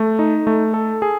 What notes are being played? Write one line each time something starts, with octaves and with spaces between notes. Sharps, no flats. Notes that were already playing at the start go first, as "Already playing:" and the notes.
Already playing: A3
D#4
A3
A4
G#4